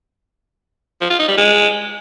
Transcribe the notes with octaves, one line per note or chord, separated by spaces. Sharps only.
F3
F4
D#4
G3
G#3